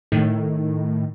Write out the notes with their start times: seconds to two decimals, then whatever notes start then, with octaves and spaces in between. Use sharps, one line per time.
0.12 A2 D#3